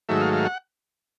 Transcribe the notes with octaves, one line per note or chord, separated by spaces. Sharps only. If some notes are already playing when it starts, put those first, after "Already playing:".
G#2 D#3 F#3 A3 E5
F5
F5
F#5